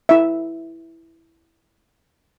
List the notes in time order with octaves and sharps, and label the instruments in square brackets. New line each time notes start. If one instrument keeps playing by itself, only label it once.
[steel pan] E4 E5